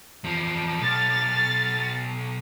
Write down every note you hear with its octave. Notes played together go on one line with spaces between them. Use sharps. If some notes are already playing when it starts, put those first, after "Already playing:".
E2 F3
B1 F6 A6